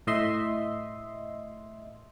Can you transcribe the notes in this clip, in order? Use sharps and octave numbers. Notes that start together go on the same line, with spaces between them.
A2 D#5 E5 C6